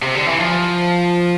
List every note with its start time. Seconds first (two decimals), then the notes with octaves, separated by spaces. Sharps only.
0.02 C3
0.15 D3
0.27 E3
0.40 F3